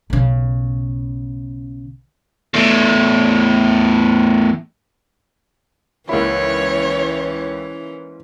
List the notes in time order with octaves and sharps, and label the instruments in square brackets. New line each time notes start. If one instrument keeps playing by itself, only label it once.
[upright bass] B1 C#3
[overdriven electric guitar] E2 A2
[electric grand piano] C#2 B5 [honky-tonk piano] G#2 A#3 E4 [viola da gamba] E3 C#4 [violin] C#5